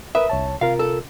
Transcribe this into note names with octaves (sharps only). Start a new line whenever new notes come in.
A#4 B4 E5 D#6
C2 C#5 A5
C3 F4 A#4 F5
A4